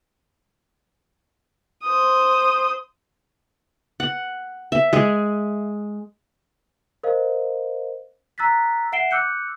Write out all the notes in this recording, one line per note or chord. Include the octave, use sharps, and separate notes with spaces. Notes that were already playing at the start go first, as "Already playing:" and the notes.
C5 D#6
F#5
E5
G#3 G#4
A#4 C5 D#5 F5
A#5 E6 F#6 A6 B6
E5 F#5 C7 D7 E7 G7
D6 E6 F#6 G6 C#7